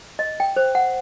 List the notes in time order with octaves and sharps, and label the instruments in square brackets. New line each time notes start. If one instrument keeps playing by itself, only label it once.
[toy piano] D#5
G5
C5
F#5